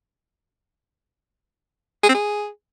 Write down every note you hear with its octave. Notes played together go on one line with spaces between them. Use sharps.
G#4
C4
G#4